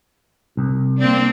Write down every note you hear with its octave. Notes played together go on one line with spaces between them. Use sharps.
C2
A#3 C4 D4